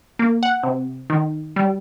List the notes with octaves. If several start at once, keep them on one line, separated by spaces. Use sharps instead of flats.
A#3
F#5
C3
D#3
G3